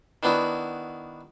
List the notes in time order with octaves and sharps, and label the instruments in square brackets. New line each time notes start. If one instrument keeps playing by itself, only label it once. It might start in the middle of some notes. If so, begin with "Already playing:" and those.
[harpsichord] D#3 B3 D4 E4 F#4